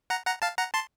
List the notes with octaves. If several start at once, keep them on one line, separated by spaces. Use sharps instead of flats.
F#5 A#5
F#5 A#5
F5 A5
F#5 A#5
A5 C6